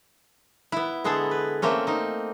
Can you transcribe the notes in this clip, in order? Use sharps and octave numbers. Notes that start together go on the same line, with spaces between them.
B3 E4
D3 G#3 B3 G#4 A4
B4
A3 A#3 C4 C#4
C4 D#4